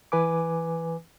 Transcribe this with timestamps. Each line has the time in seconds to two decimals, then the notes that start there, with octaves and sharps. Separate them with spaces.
0.12 E3 B4 G#5 D6